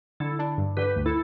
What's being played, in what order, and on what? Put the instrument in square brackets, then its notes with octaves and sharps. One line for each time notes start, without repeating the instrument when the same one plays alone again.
[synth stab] D3 [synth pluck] E4 A4
[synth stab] D4
G2
[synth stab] D3 [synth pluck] G4 B4
[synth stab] D2
[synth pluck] E4 A4